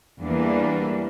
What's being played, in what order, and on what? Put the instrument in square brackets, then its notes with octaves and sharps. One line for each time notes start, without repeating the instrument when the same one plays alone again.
[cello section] E2 E3 G3 A#3 D4